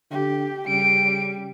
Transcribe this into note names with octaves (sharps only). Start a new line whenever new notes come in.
D3 G4
C#3 G3 D7